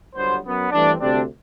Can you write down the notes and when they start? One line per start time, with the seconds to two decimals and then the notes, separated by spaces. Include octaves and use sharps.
0.15 G1 G2 F#3 B3 C5
0.44 F#2 F#3 B3
0.71 G2 E3 A3 C4 D4
1.00 D2 C3 G3 C4 D4